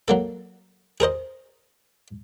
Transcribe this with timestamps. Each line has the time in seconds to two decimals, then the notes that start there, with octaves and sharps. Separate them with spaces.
0.08 F#3 A#3 A4
1.00 G#4 A#4 C5 D#5